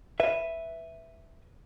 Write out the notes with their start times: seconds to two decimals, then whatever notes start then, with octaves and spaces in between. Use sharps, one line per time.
0.20 B4 E5